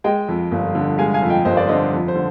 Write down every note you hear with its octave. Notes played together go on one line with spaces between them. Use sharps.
G#3 D#5 G5
F2
G1
D3
G#3 F5 G#5
F5 G#5
F2
D#5 G5
G1 C5 D#5
D5
D3 C5 D#5
F2
C5
D3